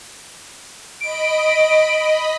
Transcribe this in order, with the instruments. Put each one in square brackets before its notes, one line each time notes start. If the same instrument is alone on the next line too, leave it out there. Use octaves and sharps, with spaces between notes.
[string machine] D#5 B5 [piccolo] D7